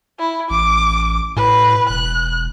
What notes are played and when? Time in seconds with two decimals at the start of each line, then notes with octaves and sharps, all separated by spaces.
0.19 E4
0.50 A1 D6
1.36 A2 B4
1.89 E1 F#6